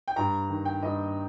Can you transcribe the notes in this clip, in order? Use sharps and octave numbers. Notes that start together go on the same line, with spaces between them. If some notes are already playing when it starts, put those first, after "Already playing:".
G5
G2 A#5
D#3
G5
G2 D#5